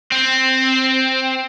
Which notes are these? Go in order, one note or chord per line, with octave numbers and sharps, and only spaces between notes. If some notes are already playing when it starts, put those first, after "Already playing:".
C4